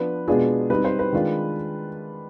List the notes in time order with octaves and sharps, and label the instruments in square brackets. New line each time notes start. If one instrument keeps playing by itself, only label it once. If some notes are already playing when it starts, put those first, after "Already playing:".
Already playing: [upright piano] F3 B3 D4 F4 B4
B2 G#3 B3 D4 F4 G#4
G3 C4 D#4 B4
C5
B4
D#3 G#3 D4 F4